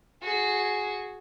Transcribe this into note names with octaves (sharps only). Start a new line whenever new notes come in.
F#4 G#4